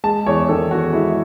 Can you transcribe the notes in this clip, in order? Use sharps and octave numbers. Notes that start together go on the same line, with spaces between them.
G#3 A5
E2 C#5
D#3 A4
E2 F#4
G#3 E4